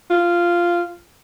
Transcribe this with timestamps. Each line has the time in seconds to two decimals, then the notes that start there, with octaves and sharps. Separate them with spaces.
0.10 F4